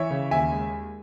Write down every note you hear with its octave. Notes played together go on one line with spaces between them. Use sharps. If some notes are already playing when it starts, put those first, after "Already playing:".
Already playing: E3 C#5 E5
C#3
D#2 E5 G#5
G#3